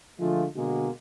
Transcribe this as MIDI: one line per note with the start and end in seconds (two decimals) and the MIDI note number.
0.20 0.44 50
0.20 0.44 53
0.20 0.44 56
0.20 0.44 57
0.20 0.44 65
0.56 0.89 47
0.56 0.89 50
0.56 0.89 56
0.56 0.89 58
0.56 0.89 66